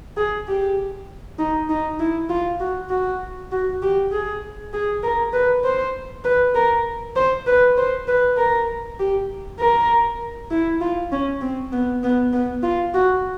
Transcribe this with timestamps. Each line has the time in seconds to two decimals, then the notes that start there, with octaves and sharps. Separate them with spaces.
0.17 G#4
0.48 G4
1.38 D#4
1.69 D#4
1.99 E4
2.30 F4
2.60 F#4
2.90 F#4
3.52 F#4
3.82 G4
4.12 G#4
4.73 G#4
5.03 A#4
5.33 B4
5.64 C5
6.25 B4
6.55 A#4
7.16 C5
7.47 B4
7.77 C5
8.08 B4
8.37 A#4
8.99 G4
9.59 A#4
10.50 E4
10.81 F4
11.12 C#4
11.41 C4
11.72 B3
12.03 B3
12.33 B3
12.63 F4
12.94 F#4